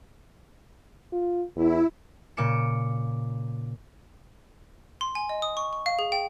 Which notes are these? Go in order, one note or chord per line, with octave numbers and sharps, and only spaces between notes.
F4
E2 E4
A#2 C#3 D6 C#7 E7
C6
G#5
D#5
D#6
C#6
C#6
F5
G#4
G5